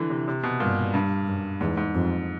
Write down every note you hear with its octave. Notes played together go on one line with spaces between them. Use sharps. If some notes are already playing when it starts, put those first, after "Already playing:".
Already playing: D3 E3
C3
C3
B2
G2 A#2
G2
F#2
E2 G#2
G#2
F2